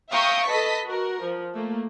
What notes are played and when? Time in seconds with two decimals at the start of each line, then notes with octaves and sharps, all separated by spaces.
0.11 E5 F5 G5 A#5 C#6 D#6
0.47 A4 B4 D#5 A5 B6
0.84 F#4 A#4
1.21 F3
1.54 A3 A#3